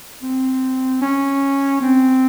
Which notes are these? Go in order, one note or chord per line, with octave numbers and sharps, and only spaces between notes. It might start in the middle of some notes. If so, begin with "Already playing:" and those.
C4
C#4
C4